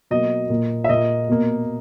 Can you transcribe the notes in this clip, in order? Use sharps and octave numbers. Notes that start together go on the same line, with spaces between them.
B2 F#3 A#3 D#5
A#2 A#3
E5
A#2 A#3 D#5
B2 A#3